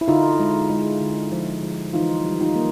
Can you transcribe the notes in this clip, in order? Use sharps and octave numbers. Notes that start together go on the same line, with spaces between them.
E4
D3 D#4 F4
G#3
G#3
D3
F3
F3
E3 D#4 F4
G3
D#4 F4
A#3